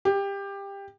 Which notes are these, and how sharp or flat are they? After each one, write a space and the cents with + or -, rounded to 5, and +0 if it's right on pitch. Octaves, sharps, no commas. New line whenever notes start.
G4 +20